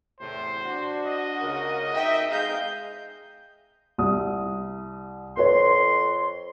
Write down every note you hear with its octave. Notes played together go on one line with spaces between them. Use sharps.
E2 A2 C3 C5
D4 F#4
D#5
C#2 C#3 A#4
D#4 E5 G5
G#3 D#4 G#4 F5 G6
C2 D#6
F2 B4 C#5 C6